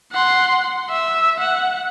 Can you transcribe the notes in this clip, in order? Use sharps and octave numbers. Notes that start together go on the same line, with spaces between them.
F#5 C6
E5
F#5